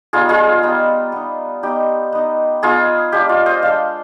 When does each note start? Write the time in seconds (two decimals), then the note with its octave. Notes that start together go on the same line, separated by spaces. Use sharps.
0.13 G3 B3 D#4 F4 G#4
0.29 F4 G#4
0.63 G3 B3 D#4
1.12 B3 D#4
1.63 B3 D#4 G4
2.12 B3 D#4
2.62 B3 D#4 F4 G#4
3.12 G#3 D4 F4 G4
3.29 F4
3.46 C5 D#5
3.62 G#3 D4 F4 D5 F5